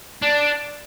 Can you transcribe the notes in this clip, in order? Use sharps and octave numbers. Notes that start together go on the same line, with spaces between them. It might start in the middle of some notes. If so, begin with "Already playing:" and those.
D4